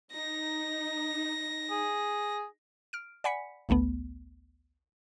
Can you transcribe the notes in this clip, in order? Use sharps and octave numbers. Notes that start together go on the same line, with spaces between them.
D#4 A#6
G#4
F6 D7
D5 F#5 G#5 B5 B6 C#7
A1 D2 A3 B3